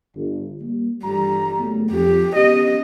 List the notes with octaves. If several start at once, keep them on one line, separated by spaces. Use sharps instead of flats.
G1
G3 A#3
G1 E3 G3 A#5
F#1 A3 B3
F2 G4
B3 C#4 G4 D#5